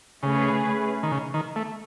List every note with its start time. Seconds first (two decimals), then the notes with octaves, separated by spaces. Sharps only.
0.23 C#3 A3 C#4 G#4 B4
1.03 D#3
1.12 C#3
1.34 D#3
1.56 A3